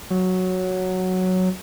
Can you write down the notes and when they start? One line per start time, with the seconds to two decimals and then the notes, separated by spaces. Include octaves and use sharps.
0.11 F#3